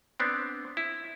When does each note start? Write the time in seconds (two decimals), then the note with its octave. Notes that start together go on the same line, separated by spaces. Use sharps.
0.20 B3 C4 D4
0.77 E4